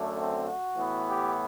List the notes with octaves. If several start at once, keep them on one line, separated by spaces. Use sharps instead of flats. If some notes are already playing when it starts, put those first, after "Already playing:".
Already playing: F#2 D3 A3
C4
F#4
A2 E3 B3
G4